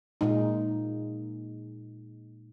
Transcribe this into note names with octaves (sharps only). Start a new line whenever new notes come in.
A#2 G#3 D#4